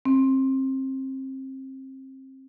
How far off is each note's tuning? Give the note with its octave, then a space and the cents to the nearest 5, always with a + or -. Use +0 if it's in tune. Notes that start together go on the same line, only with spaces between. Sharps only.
C4 +25